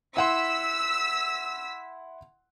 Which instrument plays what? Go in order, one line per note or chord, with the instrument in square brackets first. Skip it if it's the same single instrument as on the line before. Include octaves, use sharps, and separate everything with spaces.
[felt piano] E4 F#5 C6 [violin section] E6 B6